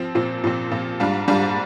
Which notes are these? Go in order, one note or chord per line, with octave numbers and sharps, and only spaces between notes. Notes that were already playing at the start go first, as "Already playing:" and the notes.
Already playing: F3 C4
A#2 F3 C4
A#2 F3 C4
A#2 F3 C4
G#2 G3 D4 F4
G#2 G3 D4 F4